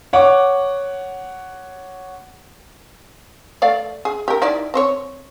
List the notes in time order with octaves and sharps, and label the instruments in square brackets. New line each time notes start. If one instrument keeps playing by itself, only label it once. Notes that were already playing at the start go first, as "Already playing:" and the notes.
[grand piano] C#5 F#5 D6
[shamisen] A3 D5 F5
G#4
G4 A#4
D#4 E4 D5
C4 C5 C#5